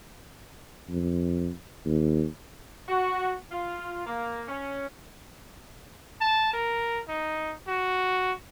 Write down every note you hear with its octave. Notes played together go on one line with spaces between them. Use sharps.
F2
D#2
F#4
F4
A#3
C#4
A5
A#4
D#4
F#4